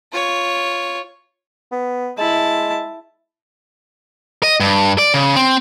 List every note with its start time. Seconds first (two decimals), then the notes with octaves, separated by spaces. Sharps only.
0.12 F4 C#5
1.71 B3
2.18 G#3 E4 A5
4.43 D#5
4.60 G2
4.98 D5
5.14 C#3
5.36 C4